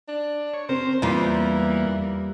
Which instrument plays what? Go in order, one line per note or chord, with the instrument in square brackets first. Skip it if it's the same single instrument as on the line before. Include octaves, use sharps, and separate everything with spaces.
[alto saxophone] D4
[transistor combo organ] C#5
[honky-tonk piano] C4 [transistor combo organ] A#4 [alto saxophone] C5
[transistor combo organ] E2 A#3 [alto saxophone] E3 [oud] G3 D#4 F4 [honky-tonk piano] A#5